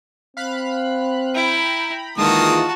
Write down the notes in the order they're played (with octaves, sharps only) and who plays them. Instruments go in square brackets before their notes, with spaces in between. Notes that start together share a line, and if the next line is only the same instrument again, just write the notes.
[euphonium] C4 [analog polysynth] F5 B5 F#6
[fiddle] E4 [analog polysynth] G5 A#5 B5
[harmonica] D#3 A#3 D#6 [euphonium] E3 [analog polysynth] G#3 F4 [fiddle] F#4 A5